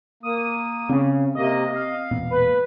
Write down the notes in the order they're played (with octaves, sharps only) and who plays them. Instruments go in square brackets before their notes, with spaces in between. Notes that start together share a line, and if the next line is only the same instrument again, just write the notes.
[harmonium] A#3 [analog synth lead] D#6
[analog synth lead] C#3 [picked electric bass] C4
[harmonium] C3 A#3 [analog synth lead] D#5
[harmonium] F5
[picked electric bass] E1 A#2 B3
[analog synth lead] B4